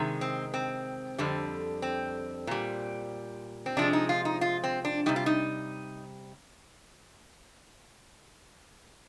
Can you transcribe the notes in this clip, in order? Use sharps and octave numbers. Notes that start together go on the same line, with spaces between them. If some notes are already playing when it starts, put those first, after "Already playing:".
Already playing: C3 D#3 G#3
C4
C4
F2 D3 G3
C4
A#2 G3
C4
C3 F3 G#3 D4
D#4
F4
D#4
F4
C4
D4
C3 G3 D#4
F4
D#4